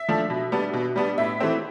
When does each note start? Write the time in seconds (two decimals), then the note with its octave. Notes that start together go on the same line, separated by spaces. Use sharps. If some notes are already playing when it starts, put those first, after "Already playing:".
Already playing: E5
0.09 F3 A3 D4
0.30 B2
0.52 G3 B3 D4
0.73 B2
0.96 G3 B3 D4
1.18 A2 E5
1.40 E3 A3 C4